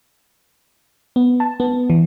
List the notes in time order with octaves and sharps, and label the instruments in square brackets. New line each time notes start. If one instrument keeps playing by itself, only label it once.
[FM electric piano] B3
A5
B3
E3